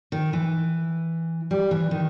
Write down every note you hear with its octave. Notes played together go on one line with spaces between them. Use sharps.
D#3
E3
G3
E3
D#3